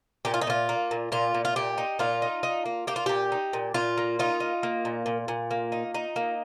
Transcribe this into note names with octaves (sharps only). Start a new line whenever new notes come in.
A#2 G4
F4
D#4
A#2 F4
A#3
A#2
A#2 F4
A#2
F4
A#2 G4
D#4
A#2 F4
D#4
D#4
A#3
A#3 G4
F4
A#2 G4
D#4
A#2
A#2 F4
A#3
D#4 F4
D#4
A#3
A#2
A#2
A#2
A#3
D#4
D#4
A#3